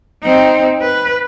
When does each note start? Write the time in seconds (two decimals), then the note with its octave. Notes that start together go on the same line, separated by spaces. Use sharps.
0.23 C4 D#4
0.82 B4